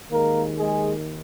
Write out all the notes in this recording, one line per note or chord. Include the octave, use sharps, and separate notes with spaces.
D#2 D#3 G#3 A#3 A#4
G#3 G#4